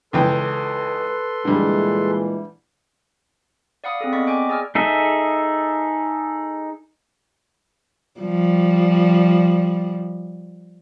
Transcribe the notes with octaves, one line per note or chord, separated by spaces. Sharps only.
C#2 E3 A4 B4 G5 C6
A#2 D3 E3 G3 G#3
D5 F5 F#5 B5 D#6
C4 G#4 A4
B3 D5 D#5 B5 C#6 B6
D#5 G5 G#5 C#6 D6
G#4 D5 G#5 E6 F6
D#4 G#4 A4 E5
F3 G3